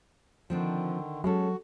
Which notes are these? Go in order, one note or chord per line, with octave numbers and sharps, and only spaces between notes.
D3 D#3 F3 C4 D4
F#3 G#3 C#4 F#4 A4